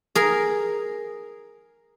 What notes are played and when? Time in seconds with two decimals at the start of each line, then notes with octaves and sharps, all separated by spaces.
0.15 G#4 A#4